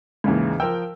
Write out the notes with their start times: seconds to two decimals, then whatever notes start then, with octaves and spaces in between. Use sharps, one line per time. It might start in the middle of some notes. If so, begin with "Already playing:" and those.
0.24 D#2 G#2 C#3 E3
0.60 F3 A#4 G5 E6